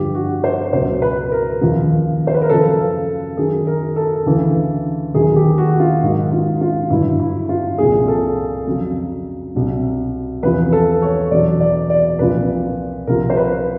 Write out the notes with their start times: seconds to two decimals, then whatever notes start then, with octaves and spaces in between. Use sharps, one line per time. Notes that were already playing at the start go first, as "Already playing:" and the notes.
Already playing: G2 D3 F3 G4
0.15 F#4
0.44 C5
0.73 C#2 B2 F#3 C5
1.02 B4
1.32 A#4
1.61 D#2 C#3 F3
2.27 C5
2.34 B4
2.41 A#4
2.50 F#2 C#3 F3 A4
3.37 F#2 D#3 F#3 G#4
3.67 A#4
3.96 A4
4.26 D2 C#3 E3
5.14 D#2 D#3 F#3 G#4
5.36 G4
5.58 F#4
5.80 F4
6.02 G#2 D#3 F#3
6.32 F4
6.61 F4
6.90 G2 D3 F#3 E4
7.20 E4
7.49 F4
7.78 C2 A#2 F3 G#4
8.08 A4
8.66 F2 C#3 F#3
9.55 C2 B2 F#3
10.43 E2 C3 F3 B4
10.73 A4
11.02 C#5
11.31 E2 B2 F#3 D5
11.60 D5
11.90 D5
12.19 C2 A#2 F3 B4
13.07 C2 C3 F3 A#4
13.30 C5
13.37 B4